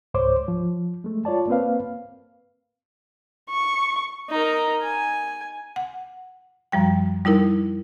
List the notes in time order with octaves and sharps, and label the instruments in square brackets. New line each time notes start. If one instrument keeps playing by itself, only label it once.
[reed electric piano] C#2 G#2 C5 C#5 D6
F3
G#3 A3
F4 C#5 D5 A5
A#3 C4 B4 F5
[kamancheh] C#6
[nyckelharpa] D#4 A#4
G#5
[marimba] F#5
F#2 F3 G3 G5
G3 D#4 E4 A#4